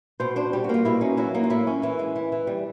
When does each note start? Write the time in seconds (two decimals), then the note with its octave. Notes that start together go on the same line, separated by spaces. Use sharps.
0.20 B2 C5
0.36 D4 C5
0.53 G3 G4
0.64 F#4
0.69 A#3 F4
0.85 B2 E4
1.01 C#4 D#4
1.17 F#3 E4
1.34 A#3 D#4
1.44 F4
1.50 A2 E4
1.67 C#4
1.82 E3 E4
1.99 G#3
2.16 E3
2.32 E3
2.47 G3